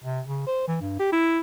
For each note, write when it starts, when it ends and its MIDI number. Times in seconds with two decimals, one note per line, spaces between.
0.04 0.21 48
0.27 0.43 49
0.47 0.64 72
0.68 0.77 52
0.81 0.95 43
0.99 1.10 67
1.12 1.41 64